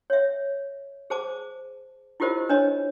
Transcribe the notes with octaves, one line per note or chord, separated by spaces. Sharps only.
C#5 E5
G#4 C5 A5 D6
E4 F4 G4 A#4 C5 D#5
D4 B4 C#5 D#5 A5